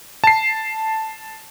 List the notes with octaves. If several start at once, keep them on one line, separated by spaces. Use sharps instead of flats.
A5 C7